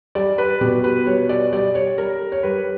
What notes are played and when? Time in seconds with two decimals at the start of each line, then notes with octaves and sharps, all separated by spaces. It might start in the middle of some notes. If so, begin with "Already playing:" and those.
0.15 G3 D5
0.38 B4
0.61 B2 G4
0.84 B4
1.07 G3 C#5
1.29 D5
1.52 G3 D5
1.75 C#5
1.98 G3 A#4
2.32 C#5
2.43 G3 B4